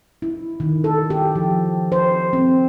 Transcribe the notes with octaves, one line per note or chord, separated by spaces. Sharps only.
E4
D#3
A4
G4
F3
C5
C4